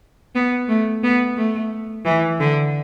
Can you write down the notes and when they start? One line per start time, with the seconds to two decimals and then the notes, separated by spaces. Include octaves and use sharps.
0.35 B3
0.69 A3
1.04 B3
1.37 A3
2.05 E3
2.40 D3